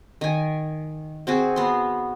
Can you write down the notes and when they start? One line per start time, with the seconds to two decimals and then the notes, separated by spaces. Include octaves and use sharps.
0.21 D#3 G#5
1.27 C4 F#4 G#4
1.56 B3 C6